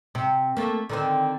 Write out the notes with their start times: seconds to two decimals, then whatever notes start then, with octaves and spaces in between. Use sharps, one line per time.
0.15 C3
0.57 A3 A#3
0.89 D3 D#3 C4